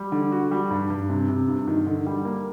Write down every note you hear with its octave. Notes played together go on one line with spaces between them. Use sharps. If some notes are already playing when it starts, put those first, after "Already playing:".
Already playing: G3
D3
F#4
G3
G2
G2
C3
C3
G2
D#3
D3
G3
A#3